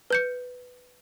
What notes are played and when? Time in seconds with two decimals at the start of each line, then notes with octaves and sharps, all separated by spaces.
0.10 B4 G6 C#7